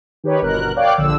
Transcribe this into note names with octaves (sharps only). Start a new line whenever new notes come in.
D#3 G4 B4 C#5
G1 B2 A#4 F#6
C#5 D5 F5 G5 D6 F#6
A#1 D3 E6